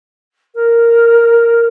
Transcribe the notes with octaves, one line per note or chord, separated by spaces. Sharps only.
A#4